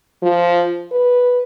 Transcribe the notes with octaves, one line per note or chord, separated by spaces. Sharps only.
F3
B4